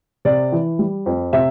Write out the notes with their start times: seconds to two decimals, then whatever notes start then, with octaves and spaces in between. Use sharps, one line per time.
0.25 C3 D5
0.52 E3
0.79 G3
1.06 F2
1.33 C3 E5